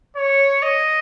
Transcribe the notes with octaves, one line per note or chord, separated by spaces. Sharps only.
C#5
D#5